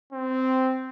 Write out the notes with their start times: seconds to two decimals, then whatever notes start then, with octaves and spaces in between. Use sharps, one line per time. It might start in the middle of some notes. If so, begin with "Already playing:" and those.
0.12 C4